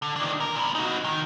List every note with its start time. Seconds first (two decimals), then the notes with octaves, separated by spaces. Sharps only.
0.02 D3
0.16 D#3 D4
0.40 A#4
0.55 A#2 B3
0.75 D#4 F#4
1.04 D#3